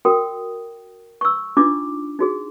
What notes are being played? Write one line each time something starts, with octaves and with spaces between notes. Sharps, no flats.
F#4 A#4 G5 D#6
C#6 E6
D4 D#4 F4 D6
D#4 F#4 G#4